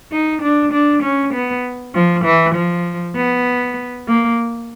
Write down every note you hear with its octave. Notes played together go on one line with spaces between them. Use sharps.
D#4
D4
D4
C#4
B3
F3
E3
F3
B3
A#3